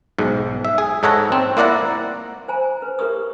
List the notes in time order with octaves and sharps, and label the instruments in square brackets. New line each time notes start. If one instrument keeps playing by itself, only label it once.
[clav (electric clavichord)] B1 G#2
E5
G#4
G#2 D#4 A4 C#5 F#5 A#5
C4
A#3 E4 D5 F#5 A#5
[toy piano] C5 G#5 A#5
B4
G4 A#4 B4 C#6 D#6